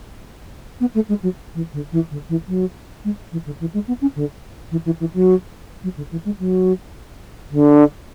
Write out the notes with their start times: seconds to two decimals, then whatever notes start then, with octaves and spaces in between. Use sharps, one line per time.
0.80 B3
0.94 A3
1.08 G#3
1.22 F#3
1.54 E3
1.73 D3
1.92 E3
2.10 D3
2.29 E3
2.48 F#3
3.04 G#3
3.32 E3
3.45 D3
3.60 E3
3.73 G#3
3.87 B3
4.01 C#4
4.15 D3
4.71 E3
4.85 E3
5.00 E3
5.13 F#3
5.83 F#3
5.97 D3
6.11 E3
6.25 G#3
6.39 F#3
7.50 D3